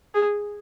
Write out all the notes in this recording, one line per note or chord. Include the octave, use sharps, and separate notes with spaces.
G#4